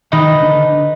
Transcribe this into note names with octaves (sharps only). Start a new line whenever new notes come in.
D#3 D#4 B4 D#5
D3